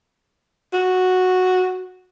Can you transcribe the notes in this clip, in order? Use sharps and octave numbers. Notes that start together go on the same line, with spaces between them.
F#4